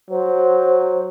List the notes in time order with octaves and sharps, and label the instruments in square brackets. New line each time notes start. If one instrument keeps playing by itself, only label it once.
[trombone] F#3 [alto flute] C5